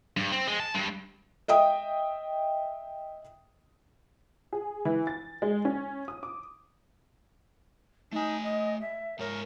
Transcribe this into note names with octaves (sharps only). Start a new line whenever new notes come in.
G2
C4
G#3
A5
G2
D#5 E5 G5 D#6
G#4
E3
A6
G#3
C#4
D#6
D6
A3 D#4 G#5
D#5
E5
G#2 A#4 C#5